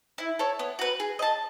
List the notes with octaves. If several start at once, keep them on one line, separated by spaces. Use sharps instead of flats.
E4
A4 C#5
B3
F#4 B4
G#4
D#5 A5